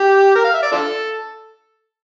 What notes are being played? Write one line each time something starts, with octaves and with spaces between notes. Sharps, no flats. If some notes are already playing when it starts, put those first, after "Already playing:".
Already playing: G4
A#4
F5
E5
D5
D4 F4 A4